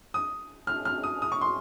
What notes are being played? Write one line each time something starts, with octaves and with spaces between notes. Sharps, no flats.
D#6
F6
F6
D#6
D#6
C#6
C6